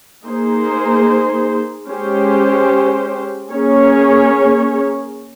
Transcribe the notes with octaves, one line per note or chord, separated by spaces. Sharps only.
A#3 D#4 G#4 C5
G#3 C#4 G4 C5
A#3 C#4 G#4 C#5